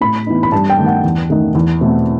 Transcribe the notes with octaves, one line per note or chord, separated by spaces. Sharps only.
A2 B5
E3 B3 D#4
B5
G2 A5
G5
D#3 A3
F#5
E2
D#3 A3 D#4
E2
B2 A3 C4